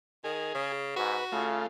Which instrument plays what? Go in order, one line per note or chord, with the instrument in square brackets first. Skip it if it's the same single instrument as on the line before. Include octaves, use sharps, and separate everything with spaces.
[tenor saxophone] D#3 [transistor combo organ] G#4
[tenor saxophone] C#3
[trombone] G#2 [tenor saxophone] F#4 [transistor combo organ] B4
[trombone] C#3 [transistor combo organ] A3 F4